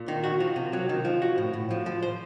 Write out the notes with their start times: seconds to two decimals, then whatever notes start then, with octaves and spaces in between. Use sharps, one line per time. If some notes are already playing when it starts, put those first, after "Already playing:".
Already playing: A#2
0.08 D#3
0.24 F#4
0.40 F3
0.56 C3
0.73 F#3
0.89 D#3
1.05 F3
1.22 F#4
1.38 A2
1.54 A2
1.71 F3
1.86 F3
2.03 C5